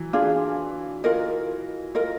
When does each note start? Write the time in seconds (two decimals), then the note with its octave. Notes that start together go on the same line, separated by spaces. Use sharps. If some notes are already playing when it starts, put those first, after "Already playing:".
Already playing: E3 F#3
0.13 D4 F4 G#4
1.04 F4 A#4 D#5
1.95 F4 A#4 D#5